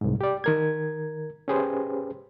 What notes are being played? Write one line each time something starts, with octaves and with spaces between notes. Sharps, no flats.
C2 G#2
G4 D5
D#3 A#4 G#6
C#4 G4 G#4 B4 C5